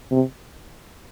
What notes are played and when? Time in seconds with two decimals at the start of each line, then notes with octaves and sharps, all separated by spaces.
0.11 C3